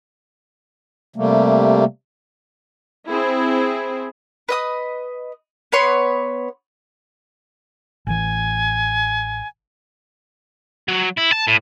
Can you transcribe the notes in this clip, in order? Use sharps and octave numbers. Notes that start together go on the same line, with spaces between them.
C3 G3 A3 A#3
C4 E4 G#4
B4 D#5 D#6
B3 B4 C#5 C6
A1 E3 G#5
F#3
E4
A5
A2